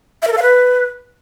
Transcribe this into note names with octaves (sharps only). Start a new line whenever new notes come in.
E5
A#4
A4
F5
B4